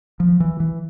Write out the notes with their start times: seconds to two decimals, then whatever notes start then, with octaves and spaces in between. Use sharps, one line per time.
0.20 F3
0.40 E3
0.60 E3